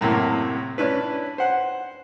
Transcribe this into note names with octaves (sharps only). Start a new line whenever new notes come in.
F#2 A2 C3 A#3
C#4 D4 E4 B4
C5 F#5